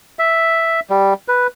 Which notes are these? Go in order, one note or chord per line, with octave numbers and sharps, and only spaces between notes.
E5
G3
B4